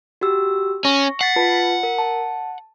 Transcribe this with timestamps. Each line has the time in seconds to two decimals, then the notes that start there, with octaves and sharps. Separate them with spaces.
0.21 F#4 G4 E6
0.85 C#4 C#6 A#6
1.21 F#5 A6 B6 C7
1.36 F4 B4 A5
1.83 A#4
1.99 A5